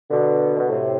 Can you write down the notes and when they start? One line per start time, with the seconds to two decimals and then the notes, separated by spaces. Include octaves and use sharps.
0.10 B2 D3
0.56 B2
0.69 A2 C3